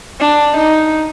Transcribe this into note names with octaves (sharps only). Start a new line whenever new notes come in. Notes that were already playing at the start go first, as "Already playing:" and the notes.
D4
D#4